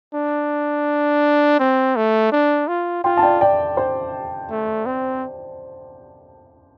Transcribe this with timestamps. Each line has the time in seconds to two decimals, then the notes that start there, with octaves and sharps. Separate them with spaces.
0.14 D4
1.60 C4
1.96 A3
2.32 D4
2.68 F4
3.04 F4 G5 C6
3.17 A5
3.23 D5 G5
3.41 D5 G5
3.77 C5
4.50 A3
4.86 C4